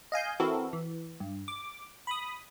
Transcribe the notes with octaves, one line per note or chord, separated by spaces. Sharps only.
D#5 F5 G#5 G6
E3 C4 E4 F#4 A4 A#4
E3
G2
D6
B5 D#6